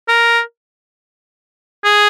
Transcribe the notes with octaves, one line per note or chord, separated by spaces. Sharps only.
A#4
G#4